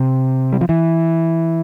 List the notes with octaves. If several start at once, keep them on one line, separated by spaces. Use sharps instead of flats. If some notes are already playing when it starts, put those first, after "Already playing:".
Already playing: C3
G3
F3
E3